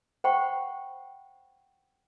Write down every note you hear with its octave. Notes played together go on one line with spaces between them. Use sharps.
C5 F#5 G5 B5 C#6